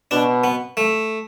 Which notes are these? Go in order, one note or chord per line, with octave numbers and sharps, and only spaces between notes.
B2 D4
B3
A3